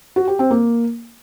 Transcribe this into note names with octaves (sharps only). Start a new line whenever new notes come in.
F#4
G4
C4
A#3